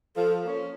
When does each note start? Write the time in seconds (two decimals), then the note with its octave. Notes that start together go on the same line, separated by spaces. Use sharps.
0.16 F3 A4
0.44 A#3 C#4